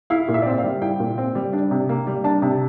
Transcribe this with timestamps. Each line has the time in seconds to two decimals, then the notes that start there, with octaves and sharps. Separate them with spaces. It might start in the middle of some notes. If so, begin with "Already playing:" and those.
0.10 E4 F5
0.28 A#2
0.34 E5
0.42 D5
0.46 C4 E5
0.58 F5
0.64 G3
0.82 E4 G5
1.00 A#2
1.18 C4
1.35 G3
1.53 D4
1.71 C3
1.89 A#3
2.07 G3
2.24 D4 A5
2.42 C3